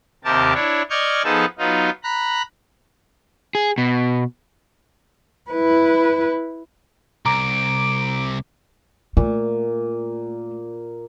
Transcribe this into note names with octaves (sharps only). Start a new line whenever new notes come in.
D#2 C3 G4 A#4 A5
D4 E4 C#5
D5 D#5 C#6 F6 G6 G#6
F3 B3 D#4 G#4 A4 A5
F#3 B3 D#4 F4
A#5 B5 F#6
G#4
B2
E4 B4
C2 A#5 D6 D7
A#2 A3